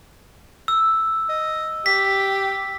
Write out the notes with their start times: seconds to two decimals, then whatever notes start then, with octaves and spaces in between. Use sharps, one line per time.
0.68 E6
1.29 D#5
1.86 G4 B6